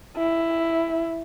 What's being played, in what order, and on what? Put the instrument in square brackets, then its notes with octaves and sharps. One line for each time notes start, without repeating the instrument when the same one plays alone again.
[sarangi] E4